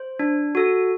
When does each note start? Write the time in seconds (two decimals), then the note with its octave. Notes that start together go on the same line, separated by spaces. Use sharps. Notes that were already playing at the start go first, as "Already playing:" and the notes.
Already playing: C5
0.19 D4
0.55 F#4 A4